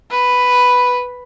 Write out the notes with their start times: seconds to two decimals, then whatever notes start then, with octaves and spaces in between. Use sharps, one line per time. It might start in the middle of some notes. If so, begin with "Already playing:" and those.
0.11 B4